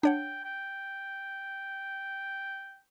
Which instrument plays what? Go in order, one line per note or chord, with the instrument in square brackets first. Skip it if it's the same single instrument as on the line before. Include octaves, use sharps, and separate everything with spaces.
[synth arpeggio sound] D4 C#5 F#5 [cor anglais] G5
[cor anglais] G5